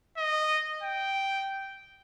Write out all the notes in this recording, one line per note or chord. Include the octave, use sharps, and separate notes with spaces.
D#5
G5